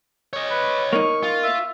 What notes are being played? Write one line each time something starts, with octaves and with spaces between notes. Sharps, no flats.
C#5 D#5
B4
A#3 D#4 C#6
F4
E5